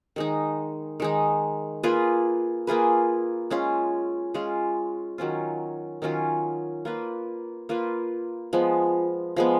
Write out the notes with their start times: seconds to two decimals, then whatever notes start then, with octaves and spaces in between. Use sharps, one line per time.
0.16 D#3 G#3 D#4
1.00 D#3 G#3 D#4
1.83 A#3 F4 G#4 B4
2.67 A#3 F4 G#4 B4
3.50 G#3 C#4 F4
4.34 G#3 C#4 F4
5.18 D#3 F#3 C#4 F4
6.02 D#3 F#3 C#4 F4
6.85 A#3 F4 B4
7.69 A#3 F4 B4
8.53 F3 G#3 B3
9.36 F3 G#3 B3